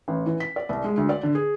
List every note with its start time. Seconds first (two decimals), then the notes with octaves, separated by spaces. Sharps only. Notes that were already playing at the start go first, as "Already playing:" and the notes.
0.08 A1
0.26 E3
0.40 B6
0.56 D5
0.69 C2
0.84 G#3
0.97 D2
1.09 D5
1.23 D3
1.35 G#4